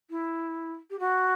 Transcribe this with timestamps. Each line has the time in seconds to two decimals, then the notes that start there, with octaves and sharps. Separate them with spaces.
0.10 E4
0.90 G4
0.99 F#4